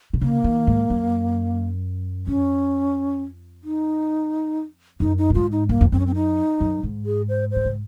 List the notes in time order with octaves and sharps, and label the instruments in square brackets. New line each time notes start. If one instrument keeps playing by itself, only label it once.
[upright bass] C3
[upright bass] C#3 [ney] A#3
[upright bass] D#3
G#2
F#2
[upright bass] F2 [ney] C#4
[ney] D#4
[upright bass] F#2 [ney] D#4
[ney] D#4
[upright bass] A#2
[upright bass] G#2 [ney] F4
[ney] D#4
[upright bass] F#2 [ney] A#3
[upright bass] F2
[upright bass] F#2 [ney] C4
[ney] C#4
C4
D#4
[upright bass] F#2
G#2
[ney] G#4
C5
[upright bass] D#3 [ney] C5
[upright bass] C#3